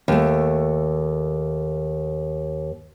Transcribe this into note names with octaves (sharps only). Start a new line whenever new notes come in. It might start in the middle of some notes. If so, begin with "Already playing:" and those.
D#2 A3